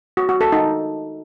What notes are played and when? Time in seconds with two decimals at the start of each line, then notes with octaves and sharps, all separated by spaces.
0.17 F#4
0.29 F#4
0.41 A4
0.52 D#4